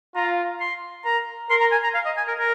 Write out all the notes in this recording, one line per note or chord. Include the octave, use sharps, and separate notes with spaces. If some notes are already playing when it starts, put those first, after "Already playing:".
F4 A#5
C6
A#4 A#5
A#4 C6
A#5
G#5
A#5
F5
D#5
G#5
A#4
A#4